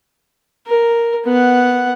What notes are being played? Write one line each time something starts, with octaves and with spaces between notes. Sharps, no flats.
A#4
B3 F#5